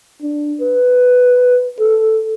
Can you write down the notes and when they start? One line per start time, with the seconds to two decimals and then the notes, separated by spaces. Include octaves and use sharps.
0.22 D4
0.61 B4
1.79 A4